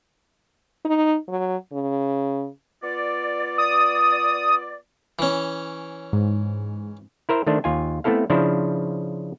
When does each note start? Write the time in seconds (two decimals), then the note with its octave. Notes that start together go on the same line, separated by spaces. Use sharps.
0.85 D#4
1.28 F#3
1.73 C#3
2.83 B3 F4 D5
3.58 D#6
5.19 E3 C#4
6.13 G#2
7.29 E4 A#4 C5 E5
7.47 D#3 A3 D4 C5
7.64 D#2 F4 G#5
8.04 A3 B3 C4 E4 A4 F5
8.30 C#3 F3 D4 E4 C5